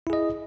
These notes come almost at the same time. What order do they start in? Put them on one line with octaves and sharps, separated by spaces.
E4 G#4 D#5